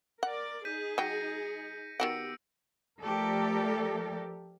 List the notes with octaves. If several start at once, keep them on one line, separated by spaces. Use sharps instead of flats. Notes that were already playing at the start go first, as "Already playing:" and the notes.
A#4 D5 F#5
D#4 G#4 G6 B6 D#7
F#3 G5 A#6 C#7 D#7
D#3 B3 F#4 G4 F#5 E6 C#7 D7
F3 A3 G4 A4 A#4 D5